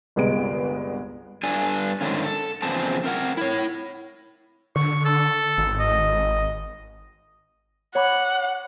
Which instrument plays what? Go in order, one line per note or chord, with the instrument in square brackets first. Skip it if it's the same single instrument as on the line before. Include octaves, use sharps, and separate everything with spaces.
[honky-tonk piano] G1 C2 G#3 B3 D7
[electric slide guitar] G2 D4 A4 G#5
G#2 D3 D#3 C#4
A4
E2 C#3 F3 C4 A5
C4 A#4 F#5
E4 C#5
[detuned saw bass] D3 [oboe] C#6
[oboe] A4
[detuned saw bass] G#1
[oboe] D#5
[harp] C#5 B5 D6 [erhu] F#5